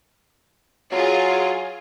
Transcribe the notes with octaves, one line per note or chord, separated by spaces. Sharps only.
F#3 F4 G#4